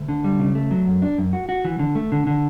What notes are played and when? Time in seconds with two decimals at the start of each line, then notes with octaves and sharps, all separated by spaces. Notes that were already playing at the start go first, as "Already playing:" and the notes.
Already playing: D2
0.09 D3
0.24 G3
0.39 C#3
0.55 A3
0.71 F#3
0.87 F#2
1.02 D4
1.18 F#2
1.33 F#4
1.49 F#4
1.65 E3
1.79 D3
1.95 A3
2.12 D3
2.27 D3